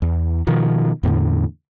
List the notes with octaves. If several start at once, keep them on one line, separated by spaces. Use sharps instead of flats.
E2
B2 D#3 F3
E2 A2 D3